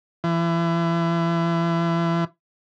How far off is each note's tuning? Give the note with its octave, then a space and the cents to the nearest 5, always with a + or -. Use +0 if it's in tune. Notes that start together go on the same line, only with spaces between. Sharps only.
E3 +30